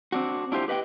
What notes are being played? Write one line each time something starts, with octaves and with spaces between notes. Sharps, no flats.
C4 D4 F#4
D4 E4 F4 G4 C5
G4 B4 D#5 F#5 G5